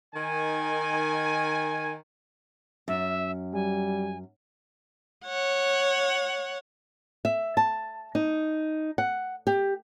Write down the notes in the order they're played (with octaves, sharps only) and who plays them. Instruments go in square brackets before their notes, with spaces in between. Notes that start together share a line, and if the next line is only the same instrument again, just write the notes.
[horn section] D#3 G#5
[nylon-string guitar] F#2 [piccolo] E5
[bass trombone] G3 [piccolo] G#5
[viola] C#5 F#5
[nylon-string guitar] E5
A5
D#4
F#5
G4